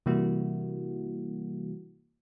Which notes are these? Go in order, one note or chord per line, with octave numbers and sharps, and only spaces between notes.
C3 E3 G3 A#3 E4 F#4